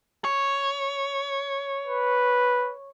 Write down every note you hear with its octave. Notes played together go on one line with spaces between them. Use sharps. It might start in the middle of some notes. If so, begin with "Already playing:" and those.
C#5
B4